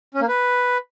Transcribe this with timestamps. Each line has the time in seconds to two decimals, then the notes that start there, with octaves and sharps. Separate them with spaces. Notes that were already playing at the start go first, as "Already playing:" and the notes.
0.14 C#4
0.21 A#3
0.28 B4